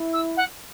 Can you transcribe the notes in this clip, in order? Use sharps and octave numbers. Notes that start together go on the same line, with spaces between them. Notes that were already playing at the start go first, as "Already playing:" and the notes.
Already playing: E4
E6
F#5